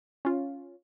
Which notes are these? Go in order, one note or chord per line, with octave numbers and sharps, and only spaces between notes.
C#4 F4